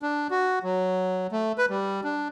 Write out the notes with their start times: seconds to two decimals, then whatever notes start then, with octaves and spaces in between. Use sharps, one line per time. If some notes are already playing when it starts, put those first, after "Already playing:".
0.02 D4
0.31 F#4
0.64 F#3
1.32 A3
1.58 B4
1.70 G3
2.04 D4